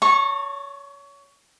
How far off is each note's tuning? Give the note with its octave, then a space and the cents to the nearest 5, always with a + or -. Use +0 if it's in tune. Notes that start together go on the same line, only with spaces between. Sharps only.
C#5 +25 A5 +45 C#6 -20